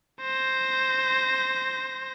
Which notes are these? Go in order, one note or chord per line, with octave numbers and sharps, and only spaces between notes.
C5 A#6